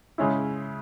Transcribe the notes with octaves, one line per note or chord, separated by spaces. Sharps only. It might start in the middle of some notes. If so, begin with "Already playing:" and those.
C#3 G#3 C#4 E4